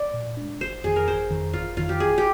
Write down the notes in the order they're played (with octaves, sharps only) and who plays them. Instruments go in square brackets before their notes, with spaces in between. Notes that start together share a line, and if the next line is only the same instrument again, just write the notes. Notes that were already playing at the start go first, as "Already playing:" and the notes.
Already playing: [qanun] D5
[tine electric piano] A#2
G#3 D4
[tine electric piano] G1 [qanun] C5
[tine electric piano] F2 D#3 [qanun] G#4
[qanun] A#4
[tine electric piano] G1 [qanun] C5
[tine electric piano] F2 D#3
[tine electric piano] G1 [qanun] F4
[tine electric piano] F2 D#3 [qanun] F4
[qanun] G4
[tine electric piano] G1 [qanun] G#4
[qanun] G4